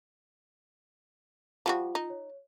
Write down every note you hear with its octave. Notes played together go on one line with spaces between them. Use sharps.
F3 G3 F4 F#4
D#4
C#5